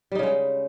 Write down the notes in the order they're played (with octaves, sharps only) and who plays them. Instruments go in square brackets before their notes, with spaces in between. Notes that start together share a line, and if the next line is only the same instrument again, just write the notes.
[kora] G3
D#4
C#3
G#3